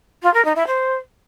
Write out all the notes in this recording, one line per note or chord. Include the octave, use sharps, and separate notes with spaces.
F4
A#4
D#4
E4
C5